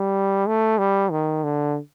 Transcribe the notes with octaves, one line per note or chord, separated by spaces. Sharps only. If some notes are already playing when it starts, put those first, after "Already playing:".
Already playing: G3
A3
G3
D#3
D3